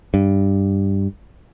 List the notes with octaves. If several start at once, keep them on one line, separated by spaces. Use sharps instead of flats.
G2